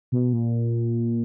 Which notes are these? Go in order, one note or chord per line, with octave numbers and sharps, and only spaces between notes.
B2
A#2